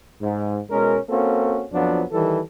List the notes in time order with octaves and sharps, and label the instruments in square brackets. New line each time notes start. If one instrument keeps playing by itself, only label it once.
[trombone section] G#2
B2 G#3 C#4 A#4
A#3 C4 C#4 F#4 A4
F2 F3 F#3 B3 D4
D#3 E3 G3 A4